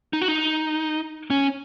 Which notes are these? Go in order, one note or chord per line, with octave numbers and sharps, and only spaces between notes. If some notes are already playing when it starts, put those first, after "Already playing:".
D#4
F#4
D#4
C#4